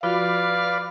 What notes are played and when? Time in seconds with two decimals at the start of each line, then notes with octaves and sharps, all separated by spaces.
0.03 F3 F4 F#4 B4 D5 F5